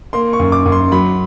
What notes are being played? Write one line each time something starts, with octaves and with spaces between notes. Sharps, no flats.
A#3 C6
C#6
F#2
D6
F#2
C6
F#3 B5